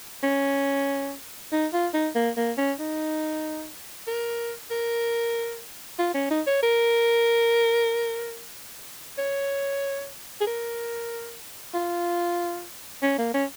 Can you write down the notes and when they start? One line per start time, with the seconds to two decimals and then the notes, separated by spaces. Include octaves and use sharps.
0.23 C#4
1.52 D#4
1.73 F4
1.94 D#4
2.15 A#3
2.37 A#3
2.58 C#4
2.80 D#4
4.07 A#4
4.71 A#4
5.99 F4
6.15 C#4
6.31 D#4
6.47 C#5
6.63 A#4
9.18 C#5
10.41 G#4
10.47 A#4
11.74 F4
13.02 C#4
13.18 A#3
13.34 C#4